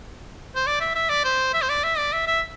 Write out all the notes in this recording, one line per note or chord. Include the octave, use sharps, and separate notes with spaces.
C5
D5
E5
E5
D5
C5
E5
C5
D5
E5
D5
E5
E5